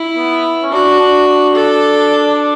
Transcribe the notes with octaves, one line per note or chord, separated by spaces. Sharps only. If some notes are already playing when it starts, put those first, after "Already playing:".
Already playing: E4
B3
C#4
D4 F#4
D4
D4
A4